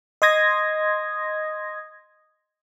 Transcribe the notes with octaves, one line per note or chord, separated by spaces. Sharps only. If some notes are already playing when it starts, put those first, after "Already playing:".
D#5 C6 D#6 G#6 A#6